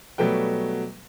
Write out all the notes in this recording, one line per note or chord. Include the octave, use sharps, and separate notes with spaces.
B2 F#3 G3 A3 B4 G5